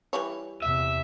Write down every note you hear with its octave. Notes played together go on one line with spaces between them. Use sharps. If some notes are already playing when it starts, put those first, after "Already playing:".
E3 G3 C#5
E2 C3 E5